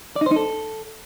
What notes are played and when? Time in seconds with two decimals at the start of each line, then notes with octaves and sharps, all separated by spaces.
0.16 D5
0.21 D#4
0.26 C5
0.31 D#4
0.36 A4